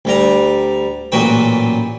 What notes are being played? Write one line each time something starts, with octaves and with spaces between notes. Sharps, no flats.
D2 G3 A#5
A1 A#2 F#3 F#4 B4 G5